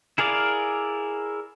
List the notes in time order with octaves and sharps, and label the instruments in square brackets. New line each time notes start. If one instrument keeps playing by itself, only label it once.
[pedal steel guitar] E4 G#4 A#4 D5 F5